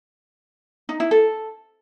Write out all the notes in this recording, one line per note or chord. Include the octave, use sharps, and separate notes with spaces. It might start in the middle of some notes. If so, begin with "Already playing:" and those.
D#4
E4
A4